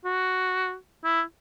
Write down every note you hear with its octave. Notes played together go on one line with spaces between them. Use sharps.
F#4
E4